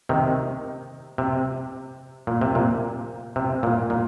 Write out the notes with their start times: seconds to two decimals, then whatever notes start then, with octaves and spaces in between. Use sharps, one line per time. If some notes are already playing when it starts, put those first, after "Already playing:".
0.09 C3 D#3
1.18 C3
2.27 A#2
2.41 C3
2.55 A#2
3.36 C3
3.63 A#2
3.90 A#2